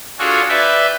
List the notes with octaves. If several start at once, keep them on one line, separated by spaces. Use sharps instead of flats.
D4 F4 F#4 G#4 A4 C#5
B4 D5 E5 G5